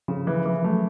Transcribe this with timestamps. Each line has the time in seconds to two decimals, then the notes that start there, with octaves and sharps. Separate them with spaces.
0.08 C#3 F3
0.27 E3
0.46 E3
0.64 F#3 A3